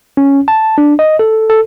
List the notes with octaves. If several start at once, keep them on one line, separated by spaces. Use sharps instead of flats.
C#4
A5
D4
D#5
A4
A4